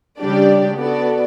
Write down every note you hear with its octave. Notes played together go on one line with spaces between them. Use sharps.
C#3 G3 D4 G4 D5
B3 F#4 A4 D5